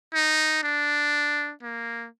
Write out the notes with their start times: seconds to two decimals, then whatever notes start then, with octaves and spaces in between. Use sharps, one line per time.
0.14 D#4
0.63 D4
1.62 A#3